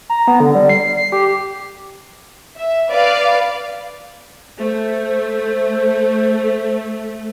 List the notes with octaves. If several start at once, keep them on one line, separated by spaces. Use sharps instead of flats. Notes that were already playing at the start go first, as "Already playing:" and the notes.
A#5
B3
D3
G3
C7
C7
G4
E5
B4 D5 F5
A3 C5